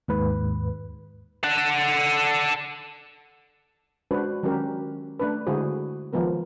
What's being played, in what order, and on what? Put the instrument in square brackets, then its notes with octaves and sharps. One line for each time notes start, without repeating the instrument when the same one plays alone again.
[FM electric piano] D#2 G#2 B4
[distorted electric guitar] A4 F#5
[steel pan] G#3 D4 F#4 B4 C5
D#3 F#3 G#3 C#4 G4 A#4
A3 D4 B4
D3 G#3 E4 F#4 G#4 C5
D#3 F3 G#3 B3 A#4